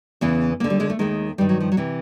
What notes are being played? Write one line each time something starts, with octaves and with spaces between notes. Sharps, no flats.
E2 C#3 E3 B3
D#2 D3 A#3
G3
G#3
A3
D#2 D#3 G#3
G2 D#3 G3
F#3
F3
F#3
C3 E3